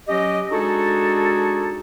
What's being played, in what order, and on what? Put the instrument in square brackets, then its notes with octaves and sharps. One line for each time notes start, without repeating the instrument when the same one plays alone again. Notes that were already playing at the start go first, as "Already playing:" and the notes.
[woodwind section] F#3 C#4 G4 D#5
G#3 D4 D#4 F#4 G#4 A4